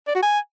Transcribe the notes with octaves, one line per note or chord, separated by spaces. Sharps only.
D5
F#4
G#5